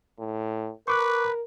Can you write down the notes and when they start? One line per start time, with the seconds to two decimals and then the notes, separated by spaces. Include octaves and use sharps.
0.19 A2
0.88 A#4 B4 C#6 D6 F#6